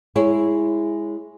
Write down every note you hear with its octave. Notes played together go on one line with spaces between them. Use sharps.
G#3 E4 G#4 C#5